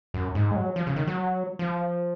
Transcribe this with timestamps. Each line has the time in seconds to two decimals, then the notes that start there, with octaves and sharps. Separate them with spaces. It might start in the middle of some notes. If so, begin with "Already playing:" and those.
0.14 F#2
0.35 G#2
0.51 G#3
0.56 F#3
0.76 F3
0.87 C#3
0.96 D#3
1.07 F#3
1.59 F3